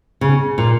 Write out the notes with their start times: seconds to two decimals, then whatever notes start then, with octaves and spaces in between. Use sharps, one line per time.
0.21 C#3
0.58 A#2